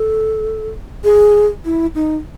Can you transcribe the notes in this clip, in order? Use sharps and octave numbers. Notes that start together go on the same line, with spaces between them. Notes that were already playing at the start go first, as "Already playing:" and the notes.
Already playing: A4
G#4
E4
D#4